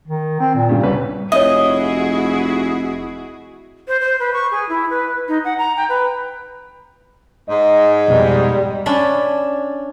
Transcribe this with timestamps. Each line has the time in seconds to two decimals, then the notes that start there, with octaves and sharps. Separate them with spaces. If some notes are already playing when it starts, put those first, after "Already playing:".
0.08 D#3
0.40 C4
0.55 A#2
0.69 G2 C#3
0.83 C2 C#4 B4
1.32 F1 E4 F#4 G#4 C#5 D#5 E5
3.87 C5
4.00 C5
4.19 B4
4.33 C#6
4.51 G#4
4.68 E4
4.90 B4
5.28 D#4
5.44 F#5
5.58 A#5
5.76 G5
5.89 B4
7.50 G#2 D#5
8.08 F2 B2 G3
8.86 C#4 D4 E5 A5 B5